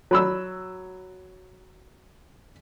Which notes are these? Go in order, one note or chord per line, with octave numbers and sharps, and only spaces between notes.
F#3 B5 E6